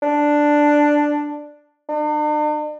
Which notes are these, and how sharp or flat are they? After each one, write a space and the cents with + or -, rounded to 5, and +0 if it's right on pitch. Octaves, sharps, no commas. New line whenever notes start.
D4 +5
D4 +45